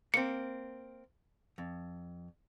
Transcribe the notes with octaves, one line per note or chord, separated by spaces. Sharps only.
A#3 C4 C#7
F2